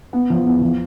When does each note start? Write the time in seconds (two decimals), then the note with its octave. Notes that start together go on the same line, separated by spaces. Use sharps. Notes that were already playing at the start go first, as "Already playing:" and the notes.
0.13 B3
0.30 F3
0.46 E2
0.62 F3